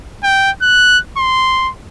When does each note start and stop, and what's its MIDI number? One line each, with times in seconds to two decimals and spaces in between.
0.23 0.51 79
0.62 0.99 90
1.17 1.70 84